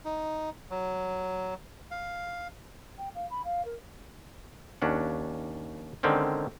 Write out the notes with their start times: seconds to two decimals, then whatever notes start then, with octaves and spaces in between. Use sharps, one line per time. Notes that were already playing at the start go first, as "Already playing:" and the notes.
0.05 D#4
0.70 F#3
1.91 F5
2.98 G5
3.14 F5
3.30 B5
3.44 F5
3.64 A#4
4.82 D#2 C#4 D4 F#5
6.03 D3 D#3 G#3 C4 C#4